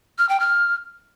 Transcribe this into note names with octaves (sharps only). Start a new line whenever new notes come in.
F6
G5
F6